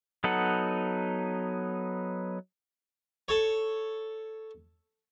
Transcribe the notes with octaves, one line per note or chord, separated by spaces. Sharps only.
F#3 B3 D#4 A4 F#5
A4 C#5